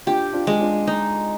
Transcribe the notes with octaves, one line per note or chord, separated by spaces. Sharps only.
D4 F4 G4
D4 F4
G#3
D4 F4
D#4